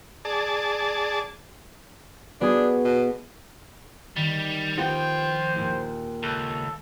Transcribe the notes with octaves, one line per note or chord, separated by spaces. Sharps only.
G#4 D5 A5
B3 D4 F#4 G#4
B2
D#3 G3
F3 B3 F4 G4 C5 G5
D#2 A#2
C#2 A4